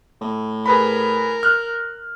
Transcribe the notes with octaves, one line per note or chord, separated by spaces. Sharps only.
A2
G#4 A#4 B4 B5
F6 F#6